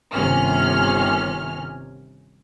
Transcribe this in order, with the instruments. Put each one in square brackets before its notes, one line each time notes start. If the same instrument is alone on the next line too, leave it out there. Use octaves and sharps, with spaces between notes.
[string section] G1 C3 D#3 C#4 F6